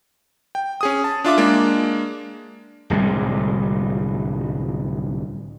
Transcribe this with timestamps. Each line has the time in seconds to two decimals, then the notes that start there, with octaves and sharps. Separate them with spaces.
0.55 G5
0.81 C#4 G#4 D#6
1.04 A5
1.24 D4 F4 E5 D6
1.38 G#3 A#3 D4
2.90 D1 C2 G3 G#3